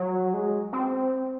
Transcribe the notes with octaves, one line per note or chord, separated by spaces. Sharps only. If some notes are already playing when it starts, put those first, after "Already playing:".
Already playing: F#3
G#3
C4